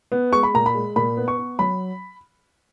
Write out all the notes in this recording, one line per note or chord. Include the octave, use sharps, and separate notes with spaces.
B3
G#3 C#6
B5
A#2 A#5
B5
G#3
A#2 B5
B3
C#6
B3
F#3 B5